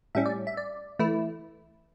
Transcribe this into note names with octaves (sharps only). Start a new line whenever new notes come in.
A2 G3 C#4 E5
D5
E5
D5
E3 A3 E4